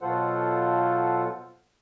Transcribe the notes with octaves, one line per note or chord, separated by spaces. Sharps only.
B2 F#3 F4 A4 C5 F#5